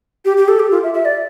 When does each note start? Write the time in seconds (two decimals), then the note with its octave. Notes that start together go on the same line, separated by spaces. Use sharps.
0.25 G4
0.37 G4
0.48 A4
0.59 G4
0.71 F4
0.83 E5
0.94 E5
1.05 D5